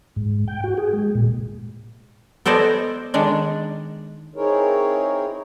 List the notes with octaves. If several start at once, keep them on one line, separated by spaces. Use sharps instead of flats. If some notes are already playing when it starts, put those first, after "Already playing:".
G#2
G5
F#4
G#4
G#3
A#2
B3 A4 C5 D5 D#5 G#5
D#3 G#3 D4
C4 D#4 E4 G#4 A#4 C#5